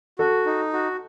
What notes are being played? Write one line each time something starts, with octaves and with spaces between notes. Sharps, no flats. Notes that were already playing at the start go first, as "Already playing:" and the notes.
F#4 A4
D#4
F#4